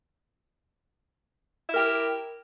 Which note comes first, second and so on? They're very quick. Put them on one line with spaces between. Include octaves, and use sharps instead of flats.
E4 A#4 G4